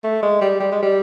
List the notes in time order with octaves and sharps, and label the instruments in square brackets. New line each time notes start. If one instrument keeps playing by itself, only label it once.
[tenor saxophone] A3
G#3
G3
G3
G#3
G3